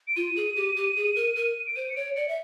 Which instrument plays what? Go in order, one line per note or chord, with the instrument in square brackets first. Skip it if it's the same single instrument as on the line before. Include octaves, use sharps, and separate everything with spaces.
[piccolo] D7
[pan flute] F4 [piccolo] D#7
[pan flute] G#4
G4
G4
G#4
A#4
A#4
[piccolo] D7
[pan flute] C5 [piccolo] D#7
[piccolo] C#7
[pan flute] C#5 [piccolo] D7
[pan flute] D5 [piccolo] C#7
[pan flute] E5